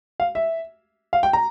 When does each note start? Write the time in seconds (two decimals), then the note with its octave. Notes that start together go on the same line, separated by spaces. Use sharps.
0.20 F5
0.35 E5
1.13 F5
1.23 G5
1.33 A#5